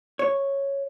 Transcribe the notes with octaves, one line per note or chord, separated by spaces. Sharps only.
C#5